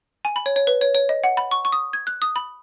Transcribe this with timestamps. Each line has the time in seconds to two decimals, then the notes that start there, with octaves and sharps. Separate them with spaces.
0.25 G#5
0.36 B5
0.46 C#5
0.56 C#5
0.67 B4
0.81 C#5
0.95 C#5
1.09 D#5
1.24 F#5
1.37 B5
1.51 C#6
1.65 C#6
1.72 D#6
1.93 G#6
2.07 F#6
2.22 D#6
2.36 B5